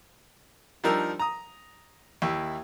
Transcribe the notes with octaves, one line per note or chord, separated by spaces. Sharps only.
F3 G3 D4 D#4 A#4 E6
A#5 D#6
D#2 E4 E5